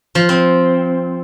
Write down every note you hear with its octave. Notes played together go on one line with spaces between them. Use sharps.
F3
C4